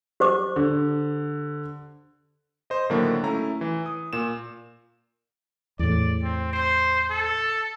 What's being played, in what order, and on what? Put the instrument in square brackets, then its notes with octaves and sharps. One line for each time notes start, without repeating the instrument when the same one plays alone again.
[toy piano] G4 C5 D6
[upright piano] D3
[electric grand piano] C5 D#5
A2 D3 D#3 F#3 A#3 D4
A3 C#4 E4 A#5
E3
D#6
A#2 E7
[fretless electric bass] E2 A2 [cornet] D5
[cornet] C4
C5
A4